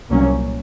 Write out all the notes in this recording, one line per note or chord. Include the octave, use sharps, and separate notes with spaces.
C2 A#2 F#3 A#3 C#4